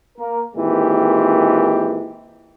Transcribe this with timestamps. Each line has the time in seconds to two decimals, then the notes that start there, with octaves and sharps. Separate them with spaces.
0.18 A#3 A#4
0.56 A#2 D#3 E3 G#3 C4 G4